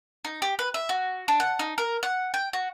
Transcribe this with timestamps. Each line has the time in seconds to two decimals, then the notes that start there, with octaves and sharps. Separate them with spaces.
0.25 D#4
0.42 G4
0.59 B4
0.74 E5
0.89 F#4
1.28 D4
1.40 F#5
1.59 D#4
1.78 A#4
2.03 F#5
2.34 G5
2.53 F#4